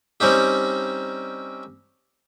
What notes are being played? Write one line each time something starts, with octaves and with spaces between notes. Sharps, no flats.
G3 C4 C#4 D#4 G4